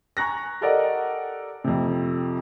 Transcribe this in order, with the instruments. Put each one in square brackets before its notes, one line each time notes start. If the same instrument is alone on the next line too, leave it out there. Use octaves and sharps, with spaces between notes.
[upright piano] G#5 A#5 C#6 F#6 A#6
G4 A4 A#4 D5 D#5 F#5
F2 C3